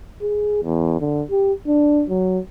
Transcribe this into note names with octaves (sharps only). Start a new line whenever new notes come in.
G#4
E2
D3
G4
D4
F#3